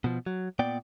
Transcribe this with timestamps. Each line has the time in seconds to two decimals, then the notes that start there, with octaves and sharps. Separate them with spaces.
0.04 B2 F3
0.26 F#3
0.59 A#2 B3 D5 G5